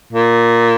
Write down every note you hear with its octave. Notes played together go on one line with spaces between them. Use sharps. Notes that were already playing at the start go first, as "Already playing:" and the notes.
A#2